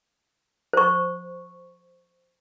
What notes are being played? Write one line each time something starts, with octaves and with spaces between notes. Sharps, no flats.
C5 C#6